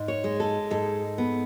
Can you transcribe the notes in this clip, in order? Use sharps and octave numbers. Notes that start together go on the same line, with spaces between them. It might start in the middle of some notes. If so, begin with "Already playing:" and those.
Already playing: G#2
C#5
G#3
A4
G#2 A4
B3